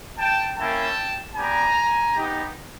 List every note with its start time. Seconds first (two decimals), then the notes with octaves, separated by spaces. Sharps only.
0.17 G5 A5
0.57 A#3 C#4 E4 G5 A5
1.35 B3 D4 G4 G#5 A#5
2.15 B3 D#4 G4